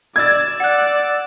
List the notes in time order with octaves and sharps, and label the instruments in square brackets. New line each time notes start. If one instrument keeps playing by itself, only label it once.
[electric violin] D5 [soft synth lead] E6 [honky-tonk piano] G#6 A6
[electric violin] D5 [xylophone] F#5 F#6